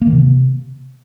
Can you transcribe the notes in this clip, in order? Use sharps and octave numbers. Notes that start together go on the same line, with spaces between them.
A#3
D#3
C3